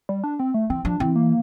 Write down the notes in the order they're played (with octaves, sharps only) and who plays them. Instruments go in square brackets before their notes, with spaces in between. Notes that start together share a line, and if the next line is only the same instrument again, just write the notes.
[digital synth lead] G3
D4
C4
A3
[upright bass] E3 [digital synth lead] C4
[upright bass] F3 [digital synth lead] D4
[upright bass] E3 [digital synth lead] C4
[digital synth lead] A#3